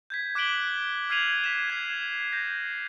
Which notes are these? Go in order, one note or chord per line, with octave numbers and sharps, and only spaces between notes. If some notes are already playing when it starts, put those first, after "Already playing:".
G6 G#6 B6
D6 F#6 B6 D7 F#7 G7
F6 G#6 C7 D#7 F7 F#7
D6 B6 E7
G#6 C7
G6 A#6